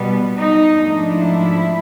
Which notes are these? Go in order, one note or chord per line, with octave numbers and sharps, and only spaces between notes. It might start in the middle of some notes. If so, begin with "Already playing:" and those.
Already playing: B2 G3 B3
D#4
G#2 F3 A3 D4
E4